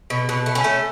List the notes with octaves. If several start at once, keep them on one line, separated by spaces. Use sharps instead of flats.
B2
B2
A3
C#4
A3